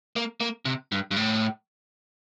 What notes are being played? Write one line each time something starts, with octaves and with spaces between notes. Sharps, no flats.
A#3
A#3
C3
G2
G2
A2